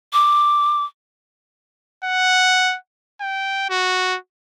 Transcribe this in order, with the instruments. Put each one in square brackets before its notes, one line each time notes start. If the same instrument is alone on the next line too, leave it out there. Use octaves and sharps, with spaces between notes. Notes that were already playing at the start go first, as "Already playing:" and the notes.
[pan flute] D6
[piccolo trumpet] F#5
G5
F#4